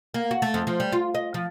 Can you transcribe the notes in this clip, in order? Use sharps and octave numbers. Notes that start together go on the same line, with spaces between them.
A#3
F#4
A3
F2
F3
G3
F4
D#5
F3